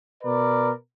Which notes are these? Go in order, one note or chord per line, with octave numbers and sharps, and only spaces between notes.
B2 A#4 B4 D5